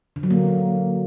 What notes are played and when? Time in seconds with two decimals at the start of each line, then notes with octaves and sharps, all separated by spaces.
0.16 D3
0.23 F#3
0.30 A#3